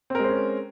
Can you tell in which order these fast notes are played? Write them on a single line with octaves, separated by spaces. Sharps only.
C4 A#4 G#3 C5 C#4